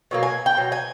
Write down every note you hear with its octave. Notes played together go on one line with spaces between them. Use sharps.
B2 F#3 A#3
G#5
G5
B2 F#3
G#5